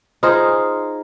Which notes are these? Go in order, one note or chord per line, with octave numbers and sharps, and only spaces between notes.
D#4 F4 G#4 C5